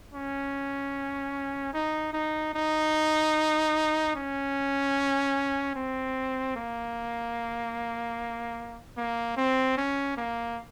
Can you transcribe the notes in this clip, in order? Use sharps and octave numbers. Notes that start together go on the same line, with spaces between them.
C#4
D#4
D#4
D#4
C#4
C4
A#3
A#3
C4
C#4
A#3